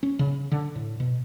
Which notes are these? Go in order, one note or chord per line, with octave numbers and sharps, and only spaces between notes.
C#4
C#3
D3
A2
B2